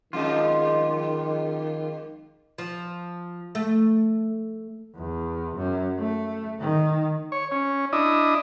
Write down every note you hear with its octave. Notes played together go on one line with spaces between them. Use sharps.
F2 D#3 G#3 F4 D#5
F3
A3
E2
F#2
A3
D#3
C#5
C#4
D4 E4 D#5